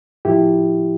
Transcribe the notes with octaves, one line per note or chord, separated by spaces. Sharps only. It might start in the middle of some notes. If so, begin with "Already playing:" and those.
A2 F3 E4 G4